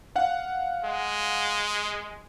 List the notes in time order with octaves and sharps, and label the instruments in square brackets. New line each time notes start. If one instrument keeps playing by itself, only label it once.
[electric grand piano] F5 F#5
[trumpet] G#3